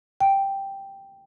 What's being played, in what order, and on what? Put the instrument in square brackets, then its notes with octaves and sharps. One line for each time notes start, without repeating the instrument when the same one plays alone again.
[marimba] G5